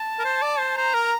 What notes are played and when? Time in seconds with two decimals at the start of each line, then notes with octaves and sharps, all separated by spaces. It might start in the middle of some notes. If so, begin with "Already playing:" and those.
Already playing: A5
0.19 A#4
0.24 C5
0.42 D5
0.59 C5
0.77 C5 A#5
0.94 A#4